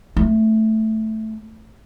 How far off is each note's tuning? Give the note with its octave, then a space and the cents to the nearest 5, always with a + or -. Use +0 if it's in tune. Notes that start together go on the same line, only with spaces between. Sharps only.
A3 +0 C4 +0